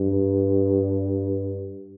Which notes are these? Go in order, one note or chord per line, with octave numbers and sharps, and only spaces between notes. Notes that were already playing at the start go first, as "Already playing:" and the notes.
Already playing: G2